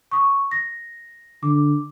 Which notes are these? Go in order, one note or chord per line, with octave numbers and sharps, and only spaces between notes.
C#6 D#6
A#6
D3 D6